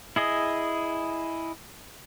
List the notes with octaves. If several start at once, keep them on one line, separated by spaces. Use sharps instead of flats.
E4 G#4 D#5